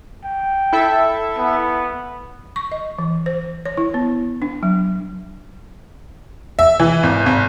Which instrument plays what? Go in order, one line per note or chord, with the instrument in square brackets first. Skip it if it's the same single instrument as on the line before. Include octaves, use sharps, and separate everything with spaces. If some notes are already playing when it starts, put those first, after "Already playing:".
[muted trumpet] G5
[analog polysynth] E4 A4 E5
[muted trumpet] B3
[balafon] C#6
D#5
E3
C5
C#5
E4
B3
D4
F#3
[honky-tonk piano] E5
E3
G#1
G#1